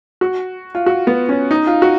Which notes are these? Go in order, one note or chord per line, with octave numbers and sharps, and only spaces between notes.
F#4
F4
F#4
B3
C#4
D#4
F4
F#4